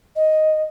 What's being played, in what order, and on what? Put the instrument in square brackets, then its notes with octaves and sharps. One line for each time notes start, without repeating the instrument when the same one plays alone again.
[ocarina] D#5